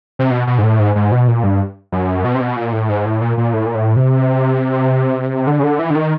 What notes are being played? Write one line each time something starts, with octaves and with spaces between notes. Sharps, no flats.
C3
B2
B2
G#2
A2
G#2
G#2
B2
A#2
G2
F#2
B2
C3
B2
A#2
A2
G#2
A2
A#2
A#2
A2
A#2
A2
C3
D3
C#3
D3
E3
D3
D#3